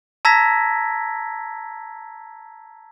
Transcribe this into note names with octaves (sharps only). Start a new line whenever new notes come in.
A5 A#5 E6 G#6 A#6 B6